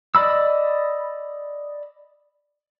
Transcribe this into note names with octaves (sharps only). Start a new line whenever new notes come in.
D5 D#5 B5 E6